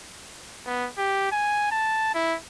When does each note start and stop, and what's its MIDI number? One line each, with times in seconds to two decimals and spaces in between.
0.66 0.88 59
0.98 1.31 67
1.32 1.71 80
1.72 2.13 81
2.15 2.36 64